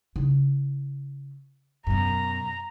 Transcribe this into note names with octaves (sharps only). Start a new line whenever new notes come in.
C#3 E4
F#2 B2 A#5